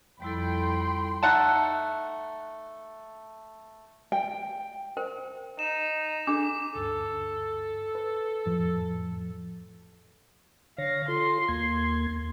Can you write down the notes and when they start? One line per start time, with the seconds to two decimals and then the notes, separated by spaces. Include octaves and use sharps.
0.22 F2 G3 E4 A4 G5 B5 C6
1.23 A3 D#4 F#5 A5
4.12 G5
4.97 A#4 C5 G5
5.59 D#4 E7
6.27 D4 G#4 A4 D6
6.75 D2 G2 A4
7.95 B4
8.46 F2 A2 F3
10.78 D3 C#5 F5 A#6
11.08 F4 A4 C6
11.49 D#2 A#3 G#6